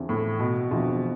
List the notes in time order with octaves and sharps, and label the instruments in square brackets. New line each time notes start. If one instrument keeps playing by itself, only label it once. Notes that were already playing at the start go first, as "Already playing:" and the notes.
Already playing: [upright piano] E2 D3 F3 C4 E4
[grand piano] A2
B2
[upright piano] E2 D3 F3 C4 E4 [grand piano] B2